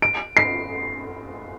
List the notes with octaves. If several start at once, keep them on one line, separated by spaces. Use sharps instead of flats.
D7
C7